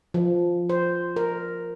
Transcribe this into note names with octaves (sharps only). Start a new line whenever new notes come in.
F3
C5
A#4